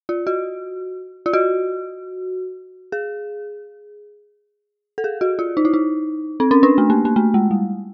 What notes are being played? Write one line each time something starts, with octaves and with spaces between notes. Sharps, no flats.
F4
F#4
F4
F#4
G#4
A4
G#4
F#4
F4
D#4
E4
D#4
C4
C#4
D4
A3
A#3
A#3
A3
G#3
G3